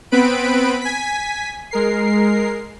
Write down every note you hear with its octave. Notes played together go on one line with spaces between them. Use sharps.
B3 C4 B4 B5 D7
G#5 B6
G#3 A#4 C7